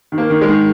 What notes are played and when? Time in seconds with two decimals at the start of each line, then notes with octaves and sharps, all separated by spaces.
0.12 D#3
0.18 A#3
0.30 D#3
0.41 G#3
0.48 D#3